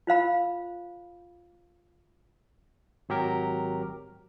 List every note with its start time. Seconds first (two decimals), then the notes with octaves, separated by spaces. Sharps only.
0.07 F4 C5 F5 B5
3.09 G#1 F#3 G4 A#4